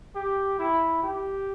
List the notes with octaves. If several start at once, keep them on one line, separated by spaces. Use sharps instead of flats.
G4
E4
G4